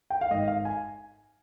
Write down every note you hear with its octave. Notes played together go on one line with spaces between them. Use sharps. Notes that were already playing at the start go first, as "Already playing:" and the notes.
G5
F5
G#1 D#5
F5
G#5